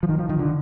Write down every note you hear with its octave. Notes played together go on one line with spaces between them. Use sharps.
F3
D#3
F3
D#3
D3